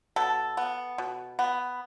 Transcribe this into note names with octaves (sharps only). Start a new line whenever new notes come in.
B2 A4
B3
B2
B3